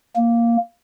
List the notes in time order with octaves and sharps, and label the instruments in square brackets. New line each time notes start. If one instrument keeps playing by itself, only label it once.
[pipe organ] A#3